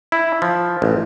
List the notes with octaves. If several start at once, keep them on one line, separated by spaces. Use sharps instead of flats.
E4
F3
A1